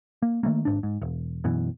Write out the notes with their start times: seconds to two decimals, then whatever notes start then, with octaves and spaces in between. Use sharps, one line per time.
0.22 A#3
0.43 D#3 F#3 A3 A#3
0.65 G#1 G#2 D4
0.83 G#2
1.02 E1
1.44 F#2 B2 E3